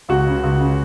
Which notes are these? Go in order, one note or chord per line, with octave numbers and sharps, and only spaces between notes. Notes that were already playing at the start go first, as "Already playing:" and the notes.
C#2 F#4
C#3
C#2
C#3